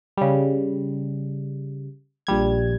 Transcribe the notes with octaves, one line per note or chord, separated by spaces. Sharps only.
C#3 G3
A#1 G3 G#6